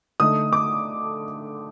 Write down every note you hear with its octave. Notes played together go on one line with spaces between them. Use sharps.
D3 A3 D#4 D#6
D6